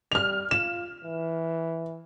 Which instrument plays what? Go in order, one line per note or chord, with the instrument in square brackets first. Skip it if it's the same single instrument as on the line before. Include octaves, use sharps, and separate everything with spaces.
[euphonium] G3 [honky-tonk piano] F6 F7
[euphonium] F4 [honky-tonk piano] E7
[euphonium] E3